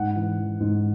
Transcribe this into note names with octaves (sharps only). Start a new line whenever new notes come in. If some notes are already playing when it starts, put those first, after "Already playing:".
Already playing: G#2 F#5
E3
E3
G#2